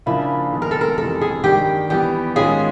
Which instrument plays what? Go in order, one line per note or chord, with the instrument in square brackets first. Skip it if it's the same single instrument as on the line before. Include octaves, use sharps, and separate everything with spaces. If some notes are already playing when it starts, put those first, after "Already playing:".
[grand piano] C#3 F3 A#3 D4 F4 [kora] E4
[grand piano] D#3 G#3 B3
[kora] A#4
A4
A#4
[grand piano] F2 C3 E3 G#3 [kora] A4
[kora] G#4
[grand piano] G2 D#3 G3 A#3 [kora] G4
[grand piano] E3 G3 B3 [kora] G4
[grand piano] G#2 D#3 G#3 C#4 F4 [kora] G#4